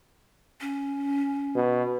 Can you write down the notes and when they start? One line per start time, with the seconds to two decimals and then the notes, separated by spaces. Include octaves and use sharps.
0.61 C#4
1.55 B2